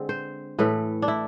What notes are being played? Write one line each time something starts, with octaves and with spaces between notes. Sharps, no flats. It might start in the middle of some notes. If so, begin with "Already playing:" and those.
Already playing: D3 G#3 C4
C5
A2 E3 A3 B4
D4
E4